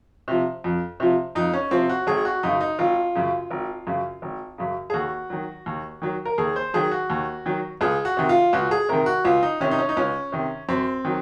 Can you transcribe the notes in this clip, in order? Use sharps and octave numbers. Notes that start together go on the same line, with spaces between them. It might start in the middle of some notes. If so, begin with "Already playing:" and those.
C3 F3
F2
C3 F3
F2 D#4
C#4
C3 F3 C4
F#4
G#1 G#4
F#4
F#2 C#3 D#4
D#4
G#1 F4
F#2 C#3
G#1
F#2 C#3
G#1
F#2 C#3
G#4
D#2 F#4
D#3 F#3
D#2
D#3 F#3
A#4
D#2 G#4
C5
D#3 F#3 G#4
F#4
D#2
D#3 F#3
C#2 G#4
F#4
C3 D#3
F4
C#2 F#4
G#4
C3 D#3 A#4
F#4
C#2 F4
D#4
C3 D#3 C#4
D#4
C#4
D#4
C#2 C#4
C3 D#3
F#2 C4
D#3 F#3